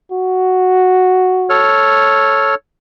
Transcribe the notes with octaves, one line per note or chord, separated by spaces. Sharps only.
F#4
A4 C#5 F6